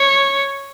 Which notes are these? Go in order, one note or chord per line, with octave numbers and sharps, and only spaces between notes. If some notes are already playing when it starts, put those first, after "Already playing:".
Already playing: C#5